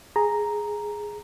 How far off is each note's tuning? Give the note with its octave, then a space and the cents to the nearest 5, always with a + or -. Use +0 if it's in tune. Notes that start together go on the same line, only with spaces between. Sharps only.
G#4 +0 A#5 +0